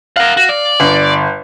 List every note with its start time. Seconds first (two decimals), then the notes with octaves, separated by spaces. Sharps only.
0.16 A#4 F5 F#5
0.37 F#4
0.49 D5
0.80 G1